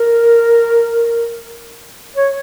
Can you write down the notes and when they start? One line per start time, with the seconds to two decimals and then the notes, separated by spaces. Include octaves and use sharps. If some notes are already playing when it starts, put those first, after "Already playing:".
Already playing: A#4
2.16 C#5